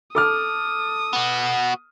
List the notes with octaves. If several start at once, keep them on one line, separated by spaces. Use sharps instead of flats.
A4 D6 D#6 F6
B3 F#4